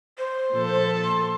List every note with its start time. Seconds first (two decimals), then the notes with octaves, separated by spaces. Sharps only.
0.18 C5
0.52 A#2 F3 A4
1.04 C6